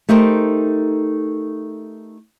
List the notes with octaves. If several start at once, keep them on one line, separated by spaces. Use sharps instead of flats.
A3 D#4 G4 A#4 C5